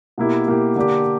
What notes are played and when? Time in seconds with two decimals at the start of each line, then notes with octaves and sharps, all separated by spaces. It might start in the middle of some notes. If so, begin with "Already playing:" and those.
0.18 B2 A#3 E4 G4
0.47 B2 A#3 E4 G4
0.76 D3 A#3 D4 G4